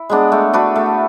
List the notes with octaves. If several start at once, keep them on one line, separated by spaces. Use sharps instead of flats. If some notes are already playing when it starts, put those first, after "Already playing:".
Already playing: E4
G#3 B3 D4
A3
D4 F#4 B4
A3